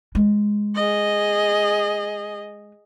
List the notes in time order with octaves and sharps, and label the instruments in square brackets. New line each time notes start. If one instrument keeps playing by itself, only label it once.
[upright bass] G#3
[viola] G#4 D#5